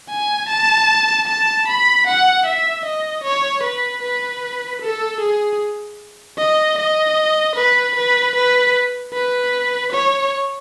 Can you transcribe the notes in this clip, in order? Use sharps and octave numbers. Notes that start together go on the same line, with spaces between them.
G#5
A5
A5
B5
F#5
E5
D#5
C#5
B4
B4
A4
G#4
D#5
D#5
B4
B4
B4
B4
C#5